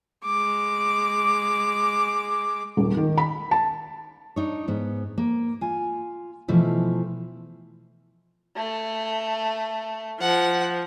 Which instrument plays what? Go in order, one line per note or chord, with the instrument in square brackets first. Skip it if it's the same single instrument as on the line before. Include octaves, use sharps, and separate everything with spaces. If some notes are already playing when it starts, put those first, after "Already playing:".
[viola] G#3 D6
[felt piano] D#1
D#3
B5
A5
[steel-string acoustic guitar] D4 D#4 C#5
G#2 B3
A#3
F4 G#5
B2 E3 F3 A3 E4
[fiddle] A3
[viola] F3 [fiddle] F#5